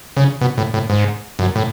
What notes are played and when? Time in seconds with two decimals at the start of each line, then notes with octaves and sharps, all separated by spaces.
0.17 C#3
0.41 B2
0.58 A2
0.74 A2
0.90 G#2
1.39 F#2
1.56 A2